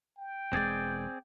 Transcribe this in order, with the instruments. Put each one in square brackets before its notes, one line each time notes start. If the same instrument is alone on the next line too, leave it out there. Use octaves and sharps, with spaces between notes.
[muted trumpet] G5
[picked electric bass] E1 G#3 [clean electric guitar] C4 G#4 D5